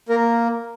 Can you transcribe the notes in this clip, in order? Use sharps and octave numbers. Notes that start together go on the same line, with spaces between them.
A#3 A#4